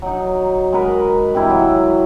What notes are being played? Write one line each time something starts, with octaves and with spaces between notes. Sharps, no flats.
F#3 D#4
G#3 F#4 A#4 B4
C3 E3 E4
F#3